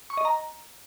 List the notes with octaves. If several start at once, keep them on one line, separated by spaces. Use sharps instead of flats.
C#6
D#5
A#5